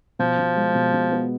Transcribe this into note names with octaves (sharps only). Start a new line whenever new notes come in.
B2 F3
B2
G#3
B2
B2
B3